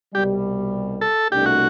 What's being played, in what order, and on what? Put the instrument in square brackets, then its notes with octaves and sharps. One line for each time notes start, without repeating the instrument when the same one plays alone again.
[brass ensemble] C2 B2 G3 [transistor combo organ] G4
[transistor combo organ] A4
[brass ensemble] C2 B2 A3 D4 [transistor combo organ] G4
[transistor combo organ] F#4